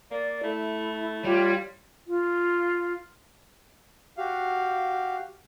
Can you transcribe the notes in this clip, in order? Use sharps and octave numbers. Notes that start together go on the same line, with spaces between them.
A#3 D5
A3 E4
G3 F4 G4 C#5 F5
F4
F#4 G4 F5